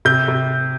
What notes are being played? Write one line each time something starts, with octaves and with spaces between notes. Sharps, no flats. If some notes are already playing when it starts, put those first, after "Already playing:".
C3 G6
C3